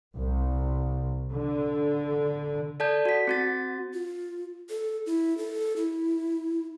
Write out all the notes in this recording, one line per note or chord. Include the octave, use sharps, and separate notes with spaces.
C2
D3
A4 D5 A5 G6
F#4 B6
C4 F#4 A6
F4
A4
E4
A4
E4